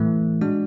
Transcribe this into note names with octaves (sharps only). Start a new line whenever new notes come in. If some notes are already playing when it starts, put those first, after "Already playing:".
Already playing: A2 E3 A3
G#3 D4 F#4